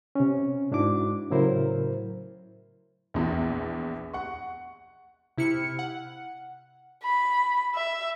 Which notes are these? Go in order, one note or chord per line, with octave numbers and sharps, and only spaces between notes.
C3 C#4
G#2 D4 E4 F#4 D6
A2 C#3 F#3 E4 A#4 C5
A#1 E2 E3
F#5 C#6
C3 E4 F6 C#7
F#5
B5
E5